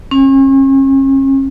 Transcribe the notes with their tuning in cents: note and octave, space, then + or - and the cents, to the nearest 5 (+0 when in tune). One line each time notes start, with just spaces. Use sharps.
C#4 -40